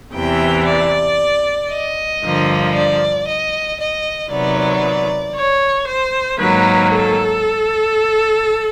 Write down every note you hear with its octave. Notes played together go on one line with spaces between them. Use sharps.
E2 C3 E3 G5
D5
D#5
G2 D3 F3 A#3
D5
D#5
D#5
C3 D#3 F#3 B3 D5
C#5
C5
G#2 D#3 F#3 A#3 B4
A4